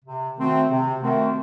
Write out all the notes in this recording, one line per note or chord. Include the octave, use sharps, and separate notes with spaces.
C3
D#3 A3 C4 F#4
C3
D#3 A3 C4 F#4